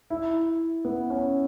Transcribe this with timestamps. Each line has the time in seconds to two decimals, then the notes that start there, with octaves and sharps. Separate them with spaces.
0.10 E4
0.85 B3
1.10 C#4